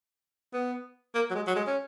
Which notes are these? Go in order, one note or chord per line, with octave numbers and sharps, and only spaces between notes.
B3
A#3
F#3
G#3
F#3
G#3
C#4